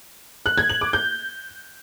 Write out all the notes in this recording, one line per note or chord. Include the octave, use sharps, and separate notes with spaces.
F#6
G#6
F#7
D6
G6